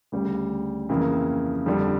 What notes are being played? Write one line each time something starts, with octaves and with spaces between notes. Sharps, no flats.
D2 C#3 G3
F2 C#3 E3 A#3 E4
F2 D3 G3